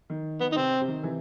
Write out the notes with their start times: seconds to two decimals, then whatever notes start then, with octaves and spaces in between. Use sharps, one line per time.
0.10 D#3
0.41 D#3 B3
0.52 D#4
0.56 C3 C4
0.81 C3
0.88 D#3
1.03 C3 E3